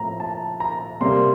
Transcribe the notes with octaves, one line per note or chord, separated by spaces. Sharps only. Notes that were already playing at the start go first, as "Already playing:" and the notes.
Already playing: A2 F3 C4 A#5
A5
A#5
C3 G3 A#3 C6